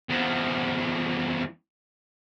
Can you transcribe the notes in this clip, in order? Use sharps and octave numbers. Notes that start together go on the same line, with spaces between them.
E2 F3